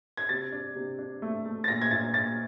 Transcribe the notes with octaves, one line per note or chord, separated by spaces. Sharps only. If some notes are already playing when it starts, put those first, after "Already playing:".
G#6
C3 A6
D4
C3
D4
A3
A3
A6
A#2 A#6
G#6
A#2 A6
A#2 A6